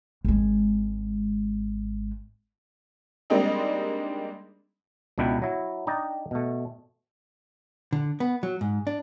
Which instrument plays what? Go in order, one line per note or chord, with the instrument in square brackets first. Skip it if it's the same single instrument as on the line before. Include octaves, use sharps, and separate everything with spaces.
[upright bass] G#1 G#3
[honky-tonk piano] G3 G#3 A#3 C4 D4 D#4
[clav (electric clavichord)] C#2 B2 D4 E4 B4 G5
F#3 E4
D4 D#4 D5 G5 A#5
B2 A3
[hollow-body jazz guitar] D3
B3
F#3
G#2
D4